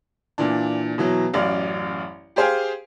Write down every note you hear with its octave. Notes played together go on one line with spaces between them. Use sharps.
A#2 E3 D4
B2 E3 F#3
A1 F#2 D5 F5
G4 G#4 C5 F5 G5 G#5